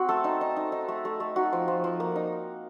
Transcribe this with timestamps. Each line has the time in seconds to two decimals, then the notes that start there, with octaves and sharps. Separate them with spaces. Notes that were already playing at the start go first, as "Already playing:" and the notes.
Already playing: C4 F#4
0.09 A3 A4
0.24 D#4
0.41 D#4
0.56 D#4
0.72 D#4
0.88 A3
1.05 A3
1.20 A3
1.36 D#4 F#4
1.53 F3
1.68 F3
1.84 F3
2.00 A#3
2.16 D#4